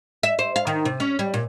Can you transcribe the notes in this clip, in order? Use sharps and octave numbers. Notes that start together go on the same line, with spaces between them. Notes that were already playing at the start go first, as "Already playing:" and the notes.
E5
C5
F5
D#3
C3
C#4
G3
A#2